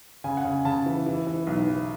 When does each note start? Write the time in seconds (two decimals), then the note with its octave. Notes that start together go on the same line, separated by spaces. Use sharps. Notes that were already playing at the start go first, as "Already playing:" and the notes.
0.24 C#3 G#5
0.37 F#5
0.44 C#3
0.51 G#5
0.65 C#3 A5
0.86 E3
1.06 E3
1.27 E3
1.47 B1
1.68 E3